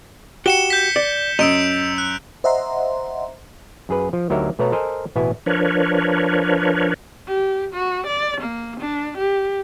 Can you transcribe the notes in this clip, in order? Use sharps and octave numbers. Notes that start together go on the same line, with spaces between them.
F#4 G4 C#7 E7 G7
G6 B6
D5
F#2 D#5 E6 D7 F7
F#6
C5 D#5 E5 F#5 A#5 C6
F#2 G#4 B4
F3
D2 F#3 D#4 G4 A#4 E5
B2 A3 B3 C#5 F#5 A#5
A4 A#4 C5 D#5 G#5
A1 B2 B3 E4 G#5
F3 D4 A#4 B4 C#5
G4
F#4
D5
A#3
D4
G4